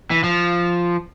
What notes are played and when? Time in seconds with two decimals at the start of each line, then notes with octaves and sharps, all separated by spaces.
0.11 E3
0.24 F3